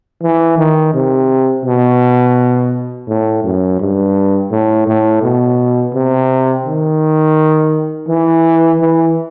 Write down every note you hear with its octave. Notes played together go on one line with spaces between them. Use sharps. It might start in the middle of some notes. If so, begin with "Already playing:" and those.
E3
D#3
C3
B2
A2
F#2
G2
A2
A2
B2
C3
D#3
E3
E3